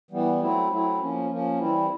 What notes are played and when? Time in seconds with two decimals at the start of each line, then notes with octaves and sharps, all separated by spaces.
0.11 E3 G3 B3
0.40 F#3 A3 C4 E4
0.70 F#3 A3 C4 E4
1.00 F3 A#3 C#4
1.29 F3 A#3 C#4
1.58 E3 G3 C4 E4